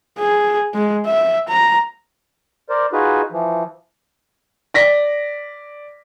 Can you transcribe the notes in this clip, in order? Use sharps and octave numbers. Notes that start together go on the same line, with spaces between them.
G#4
G#3
E5
A#5
A#4 C5 D5
D#4 F4 F#4 G#4 B4
E3 F3
D5 A#6 B6